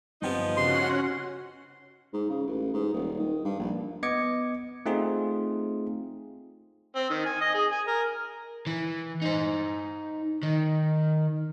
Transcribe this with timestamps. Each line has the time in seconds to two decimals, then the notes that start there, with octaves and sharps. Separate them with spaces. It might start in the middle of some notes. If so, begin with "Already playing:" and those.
0.22 G1 F3 B3 C4 D#4 G4
0.57 C#3 C#4 F#4 G4 F#5 C6
2.13 G#2
2.29 C#3
2.47 A1
2.73 G#2
2.94 D#1
3.19 D#3
3.45 G2
3.59 A#1
4.03 B3 D#5 D6 G#6 C#7
4.86 A3 C4 D#4 F4 G#4
6.96 C4
7.10 D#3
7.25 G#5
7.41 D#5
7.54 G#4
7.72 G#5
7.87 A#4
8.67 E3
9.22 D#4 C5
10.43 D#3